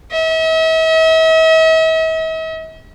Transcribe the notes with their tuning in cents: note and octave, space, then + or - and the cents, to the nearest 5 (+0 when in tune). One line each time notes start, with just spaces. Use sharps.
E5 -45